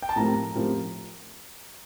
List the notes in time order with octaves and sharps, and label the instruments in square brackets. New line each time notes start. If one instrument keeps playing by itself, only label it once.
[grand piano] G5
A5
[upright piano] A2 F3 C4 G4 A#4 [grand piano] A#5
[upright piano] A2 F3 C4 G4 A#4